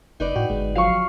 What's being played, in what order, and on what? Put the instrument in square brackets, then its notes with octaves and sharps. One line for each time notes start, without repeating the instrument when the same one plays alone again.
[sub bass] F#1 [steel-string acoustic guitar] D#4 B4 D5
[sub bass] A2 [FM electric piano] F#4 G5
[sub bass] G1 [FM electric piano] G#3
[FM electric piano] F3 F#3 C7 [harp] F5 C#6